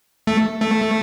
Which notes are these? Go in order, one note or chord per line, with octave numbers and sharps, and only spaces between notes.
A3
A3